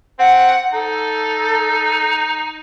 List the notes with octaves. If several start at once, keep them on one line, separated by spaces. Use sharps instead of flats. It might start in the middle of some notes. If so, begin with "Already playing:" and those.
C4 F#5
D#4 A4